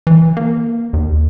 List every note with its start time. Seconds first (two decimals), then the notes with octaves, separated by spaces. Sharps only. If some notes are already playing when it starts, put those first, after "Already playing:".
0.07 E3
0.37 A#3
0.93 D#2